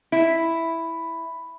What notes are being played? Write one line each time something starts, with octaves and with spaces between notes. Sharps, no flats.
E4